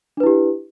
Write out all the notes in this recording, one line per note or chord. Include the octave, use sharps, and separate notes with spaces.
D4 E4 G4 B4